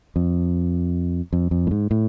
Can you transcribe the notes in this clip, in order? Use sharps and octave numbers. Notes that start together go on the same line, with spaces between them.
F2
F2
F2
A2
G#2
A2